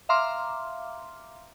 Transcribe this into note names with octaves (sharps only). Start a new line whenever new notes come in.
E5 F5 A#5 C6 D6 F6